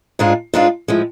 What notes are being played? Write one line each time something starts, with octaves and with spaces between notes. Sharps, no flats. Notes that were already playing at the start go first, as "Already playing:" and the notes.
G#2 G#3 D4 F4
G#2 G#3 D4 F4
A2 F3 G#3